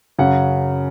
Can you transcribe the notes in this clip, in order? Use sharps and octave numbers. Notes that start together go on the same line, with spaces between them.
F#2 C#3 F#3 F#5